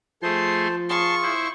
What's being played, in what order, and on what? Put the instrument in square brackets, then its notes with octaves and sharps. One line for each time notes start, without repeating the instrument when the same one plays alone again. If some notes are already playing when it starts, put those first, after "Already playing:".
[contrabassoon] F3 [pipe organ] A3 G#4 C6 [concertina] C5 A5
[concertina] F4 G#4 [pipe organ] A5 C6 [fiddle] C#6
[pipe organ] E4 C5